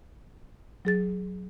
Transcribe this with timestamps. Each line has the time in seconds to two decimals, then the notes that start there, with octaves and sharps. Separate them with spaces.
0.85 F#3 G#4 A6